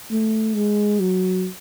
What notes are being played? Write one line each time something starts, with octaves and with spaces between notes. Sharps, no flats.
A3
G#3
F#3